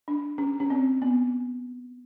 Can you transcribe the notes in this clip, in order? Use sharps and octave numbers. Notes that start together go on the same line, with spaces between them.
D4
C#4
C#4
C4
B3